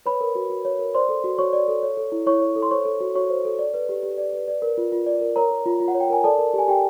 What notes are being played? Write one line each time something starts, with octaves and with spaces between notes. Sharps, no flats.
B4 C#5 B5
A#4
F#4
F#4
C#5
A#4
C5 D5 C6
A4
F#4
F#4 C#5 C#6
D5
A4
C#5
A4
E4
E4 C#5 C#6
C#5
A4
C6
C5 C#5 C#6
A4
F#4
F#4 C#5 C#6
C5
A4
D5
B4
G4
G4
D5
B4
D5
A#4
F4
F4
D5
A#4
A#4 C#5 A#5
A#4
F4
F4
F#5
C#5
G5
A#4 G#5
A4 D5 A5
A#4
G4 G#5
G4 G5